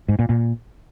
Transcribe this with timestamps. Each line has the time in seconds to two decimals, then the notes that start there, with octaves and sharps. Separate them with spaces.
0.09 G#2
0.19 A#2
0.29 A#2